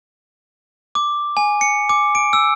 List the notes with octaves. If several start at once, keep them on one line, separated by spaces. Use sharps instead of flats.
D6
G#5
C#7
D6
D7
E6